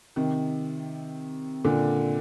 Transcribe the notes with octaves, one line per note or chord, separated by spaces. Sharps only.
C3 D#3
A#2 D3